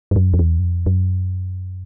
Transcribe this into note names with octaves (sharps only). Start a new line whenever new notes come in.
G2
F#2
F2
E2
F#2
F2
F#2